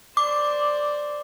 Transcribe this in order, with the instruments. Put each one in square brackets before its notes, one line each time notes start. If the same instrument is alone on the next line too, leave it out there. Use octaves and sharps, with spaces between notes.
[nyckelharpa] C5 D5 [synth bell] D6